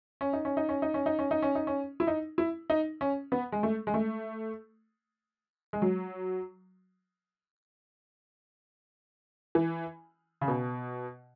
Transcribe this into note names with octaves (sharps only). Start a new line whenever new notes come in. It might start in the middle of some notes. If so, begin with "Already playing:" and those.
C#4
D#4
C#4
D#4
C#4
D#4
C#4
D#4
C#4
D#4
C#4
D#4
C#4
E4
D#4
E4
D#4
C#4
B3
G#3
A3
G#3
A3
G#3
F#3
E3
C#3
B2